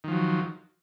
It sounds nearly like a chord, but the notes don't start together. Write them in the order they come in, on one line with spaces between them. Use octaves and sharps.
D#3 F3 F#3